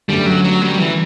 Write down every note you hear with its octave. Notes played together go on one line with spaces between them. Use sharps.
G1 F#2 D3 G3 A3
F#3
F#3
G3
E3